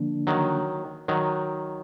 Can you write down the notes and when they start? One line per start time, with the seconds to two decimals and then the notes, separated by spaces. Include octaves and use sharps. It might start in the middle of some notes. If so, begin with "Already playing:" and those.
Already playing: D3 F3 A#3 D4
0.27 D#3 F#3
1.08 D#3 F#3